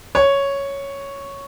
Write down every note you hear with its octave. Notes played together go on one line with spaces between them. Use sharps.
C#5